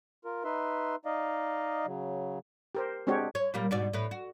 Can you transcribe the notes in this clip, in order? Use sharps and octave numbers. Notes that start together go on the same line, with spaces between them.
F4 A#4
D#4 B4 E5 C6
D#4 D5 D#5 F5
C#3 F#3
G4 A#4 C5
G#3 C4 D4 F#4 G4 C#5
C#5
A#2 G3 A#3
G#2 B2 D5
A2 B4
F#4